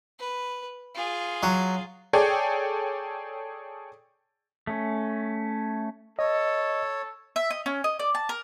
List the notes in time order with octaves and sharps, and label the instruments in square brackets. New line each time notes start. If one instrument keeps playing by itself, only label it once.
[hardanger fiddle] B4
F4 G#4
[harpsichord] F#3
[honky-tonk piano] G#4 A4 C#5 D5 G5
[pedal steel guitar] A3 C#4
[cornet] A4 [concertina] C#5 [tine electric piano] D#5
[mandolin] E5
D#5
C#4
D#5
D5
A5
A#4